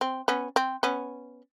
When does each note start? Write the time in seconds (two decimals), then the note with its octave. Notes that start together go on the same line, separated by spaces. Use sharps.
0.01 C4
0.28 B3 C#4
0.56 C4
0.83 B3 C#4